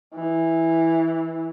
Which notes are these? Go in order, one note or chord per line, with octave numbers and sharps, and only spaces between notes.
E3